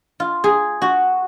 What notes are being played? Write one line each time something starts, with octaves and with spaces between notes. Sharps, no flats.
F4
G#4
F#4